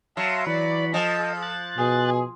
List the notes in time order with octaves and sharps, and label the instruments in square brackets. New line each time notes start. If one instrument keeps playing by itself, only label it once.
[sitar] F#3 [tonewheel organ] E5 F5 C6 [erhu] A5
[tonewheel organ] E3 B5 [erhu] D5
[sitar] F3 [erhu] A4 [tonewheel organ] D#5
[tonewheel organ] F#6 A6
[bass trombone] B2 [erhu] G#4